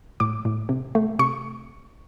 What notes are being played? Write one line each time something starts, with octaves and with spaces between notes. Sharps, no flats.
A2 D6
A2
C3
A3
C3 C#6